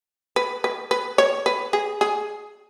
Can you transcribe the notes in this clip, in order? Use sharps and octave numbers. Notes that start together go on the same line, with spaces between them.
B4
B4
B4
C#5
B4
G#4
G#4